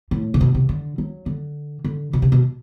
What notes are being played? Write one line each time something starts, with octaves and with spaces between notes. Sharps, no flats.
A2
C3
B2
C3
D3
F#3
D3
D3
B2
C3
B2